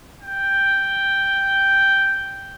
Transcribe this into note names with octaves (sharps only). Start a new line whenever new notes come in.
G5